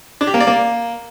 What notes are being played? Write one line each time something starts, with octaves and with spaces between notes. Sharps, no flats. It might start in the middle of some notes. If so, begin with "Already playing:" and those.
D4
G4
A#3
D5
A#3